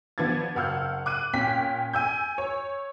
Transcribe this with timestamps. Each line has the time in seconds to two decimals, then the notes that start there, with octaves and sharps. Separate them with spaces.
0.18 F3 B3 D4 G#6 A6
0.55 F#1 F5 F#5 E6 F6 G6
1.06 D6 F#6 D#7
1.33 A#2 C#4 G5 B6
1.93 G#5 E6 G6
2.38 C#5